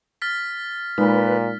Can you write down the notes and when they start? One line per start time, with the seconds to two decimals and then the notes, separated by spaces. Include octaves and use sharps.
0.22 F6 A6 B6
0.98 A#2 G#3 D#4 B4